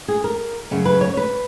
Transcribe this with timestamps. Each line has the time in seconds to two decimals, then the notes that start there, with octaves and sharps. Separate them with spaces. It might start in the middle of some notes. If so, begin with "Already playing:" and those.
0.08 G#4
0.24 A#4
0.71 F#2 C#3 F#3
0.85 B4
1.01 C#5
1.17 B4